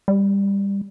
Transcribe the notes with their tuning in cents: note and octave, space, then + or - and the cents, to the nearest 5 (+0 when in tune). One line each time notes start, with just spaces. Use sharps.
G3 +20